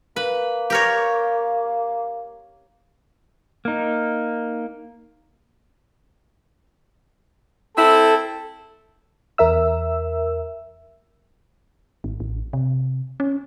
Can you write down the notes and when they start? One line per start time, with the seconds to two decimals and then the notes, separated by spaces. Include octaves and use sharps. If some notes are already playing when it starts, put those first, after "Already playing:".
0.16 A#3 B4
0.70 G4 A#4 C#5
3.65 A#3 D#4
7.77 C4 E4 A4
9.38 E2 A#4 E5 E6
12.04 G#1
12.20 A1
12.53 C3
13.20 C#4